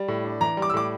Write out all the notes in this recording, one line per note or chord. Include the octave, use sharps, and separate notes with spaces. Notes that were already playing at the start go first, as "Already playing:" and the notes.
Already playing: G3
A2
D4
E3 A#5
G3
D6
E6
A2 D6